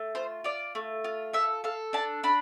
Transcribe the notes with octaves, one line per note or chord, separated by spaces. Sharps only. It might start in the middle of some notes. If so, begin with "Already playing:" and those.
Already playing: A3
F4 C5
F4 D5
A3
F4
A4 E5
A4 F5
D4 A5
D4 B5